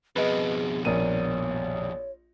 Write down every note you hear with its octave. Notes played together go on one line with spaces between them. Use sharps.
F2 B2 G#4 B4 D#5
A#1 A#3 C#5 D#7